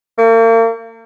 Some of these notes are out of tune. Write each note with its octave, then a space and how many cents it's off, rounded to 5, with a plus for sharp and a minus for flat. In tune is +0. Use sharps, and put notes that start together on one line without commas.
A#3 -40